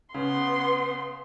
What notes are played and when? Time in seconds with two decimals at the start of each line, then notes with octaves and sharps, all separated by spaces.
0.14 C#3 B3 C6